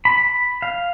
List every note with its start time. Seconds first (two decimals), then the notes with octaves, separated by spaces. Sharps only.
0.05 B5
0.62 F5